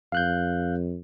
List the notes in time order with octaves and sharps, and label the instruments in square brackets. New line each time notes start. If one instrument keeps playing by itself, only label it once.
[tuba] F2 [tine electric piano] F5 F#6 G6